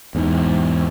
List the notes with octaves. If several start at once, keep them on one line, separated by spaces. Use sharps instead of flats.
E2 G#2